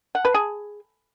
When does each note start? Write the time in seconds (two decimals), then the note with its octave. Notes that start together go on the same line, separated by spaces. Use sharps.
0.15 F#5
0.25 B4
0.34 G#4